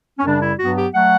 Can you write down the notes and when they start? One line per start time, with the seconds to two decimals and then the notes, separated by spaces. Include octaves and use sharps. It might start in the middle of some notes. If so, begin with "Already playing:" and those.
0.18 C#4
0.25 F#2 C#3 G3 D4
0.42 E4
0.59 G2 F#3 B3 F#4
0.77 G4
0.94 F#3 A3 F#5